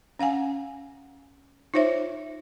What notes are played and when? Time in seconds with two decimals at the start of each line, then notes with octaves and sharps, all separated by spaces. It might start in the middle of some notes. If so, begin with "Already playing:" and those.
0.19 C#4 F5 F#5 G#5
1.74 D#4 F4 C5 C#5 E5